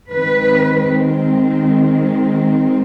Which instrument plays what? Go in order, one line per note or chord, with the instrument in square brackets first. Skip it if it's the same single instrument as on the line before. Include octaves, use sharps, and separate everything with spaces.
[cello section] D#3 G#3 C4 B4